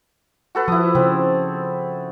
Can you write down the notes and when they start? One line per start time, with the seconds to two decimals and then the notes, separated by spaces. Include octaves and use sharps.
0.55 F#4 A4 B4
0.68 F3 E4 D#6
0.95 C#3 C4